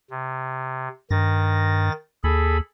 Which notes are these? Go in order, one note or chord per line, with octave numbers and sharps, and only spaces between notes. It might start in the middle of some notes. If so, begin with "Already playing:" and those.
C3
G2 D#3 A6 A#6
D#2 G#4 A4 B5